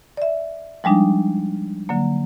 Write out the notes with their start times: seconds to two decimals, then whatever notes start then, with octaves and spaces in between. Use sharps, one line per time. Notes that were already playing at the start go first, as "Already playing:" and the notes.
0.17 D5 E5
0.84 F3 G3 G#3 D4 D#4
1.89 D3 F#3 A#3